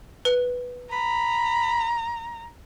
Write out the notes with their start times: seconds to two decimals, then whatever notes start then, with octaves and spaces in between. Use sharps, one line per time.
0.25 B4
0.92 A#5 B5